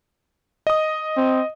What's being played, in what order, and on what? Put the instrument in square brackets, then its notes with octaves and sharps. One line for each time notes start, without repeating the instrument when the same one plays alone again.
[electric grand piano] D#5 D#6
[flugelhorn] C4